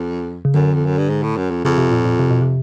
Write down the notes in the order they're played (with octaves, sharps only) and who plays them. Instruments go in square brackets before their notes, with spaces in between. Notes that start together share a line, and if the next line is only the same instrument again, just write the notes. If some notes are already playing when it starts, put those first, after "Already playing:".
Already playing: [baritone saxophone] F2
[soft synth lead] C#3
[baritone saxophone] F#2 [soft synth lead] D3
[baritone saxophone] F2
F#2
G2
G#2
A2
F#2
F2
[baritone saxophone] F2 [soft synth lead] C#3
[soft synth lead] C3
A#2
A#2
C3
B2
C3